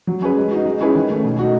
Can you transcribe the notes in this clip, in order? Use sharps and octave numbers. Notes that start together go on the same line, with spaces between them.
F#3
C#4 G#4 B4
G#3
D#4 F#4
G#3
C#4 E4 G#4 B4
D#3
A3 C#4
B2
A3 D#4 F#4